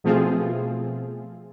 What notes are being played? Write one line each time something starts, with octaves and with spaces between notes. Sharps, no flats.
B2 F3 A3 C4 F4 G#4